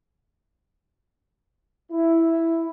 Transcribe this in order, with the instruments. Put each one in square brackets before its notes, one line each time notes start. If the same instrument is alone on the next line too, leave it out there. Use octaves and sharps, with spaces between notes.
[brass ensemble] E4